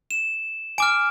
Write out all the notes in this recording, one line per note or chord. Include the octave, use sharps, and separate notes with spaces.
E7
G#5 D6 F6 D7